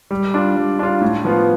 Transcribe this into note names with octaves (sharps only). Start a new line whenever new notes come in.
G3
D4 F4
G3
D4 F4
A2
F3 B3 F4